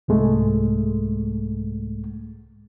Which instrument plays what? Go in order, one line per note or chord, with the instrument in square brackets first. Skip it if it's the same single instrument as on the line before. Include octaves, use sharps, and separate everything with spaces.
[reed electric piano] C2 G#2 G#3 A3